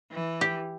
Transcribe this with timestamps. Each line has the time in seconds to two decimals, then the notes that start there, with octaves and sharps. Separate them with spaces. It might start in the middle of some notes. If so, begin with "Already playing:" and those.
0.12 E3
0.41 G4